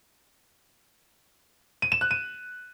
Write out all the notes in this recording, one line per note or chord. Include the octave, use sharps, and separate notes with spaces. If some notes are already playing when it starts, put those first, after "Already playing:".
D#7
E7
F#6
D#7